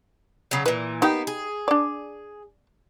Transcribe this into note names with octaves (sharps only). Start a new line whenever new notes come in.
C#3 F#3
A#2 E3 B4
A#3 B3 D#4 G4 G5
G#4
D4 D5